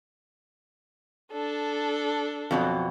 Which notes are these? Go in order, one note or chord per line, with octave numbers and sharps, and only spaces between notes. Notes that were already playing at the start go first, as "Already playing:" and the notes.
D4 A4
F2 B2 F#3